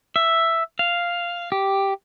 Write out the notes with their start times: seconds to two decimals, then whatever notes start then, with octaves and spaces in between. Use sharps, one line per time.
0.16 E5
0.79 F5
1.52 G4